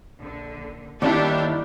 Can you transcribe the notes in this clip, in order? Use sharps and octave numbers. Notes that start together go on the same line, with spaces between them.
A#1 D3
G1 D#2 D#3 D4 E4 G4 A4 D5